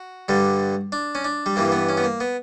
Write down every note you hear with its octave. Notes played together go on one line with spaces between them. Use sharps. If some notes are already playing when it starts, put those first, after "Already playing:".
Already playing: F#4
G2 D3 G3
D4
C#4
D4
G3
G2 E3 G3 A#3
B3
C#4
B3
A#3
B3